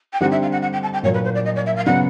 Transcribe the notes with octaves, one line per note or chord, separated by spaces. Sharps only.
G5
D3 G3 C4 D#4 G4 F#5
E5
F5
F#5
F#5
G5
A5
G5
A#2 F#3 A#3 C#5
B4
C5
D5
D#5
D5
E5
F5
C#3 F#3 B3 F#5